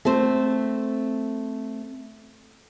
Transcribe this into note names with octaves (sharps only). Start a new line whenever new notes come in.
A3 C4 C5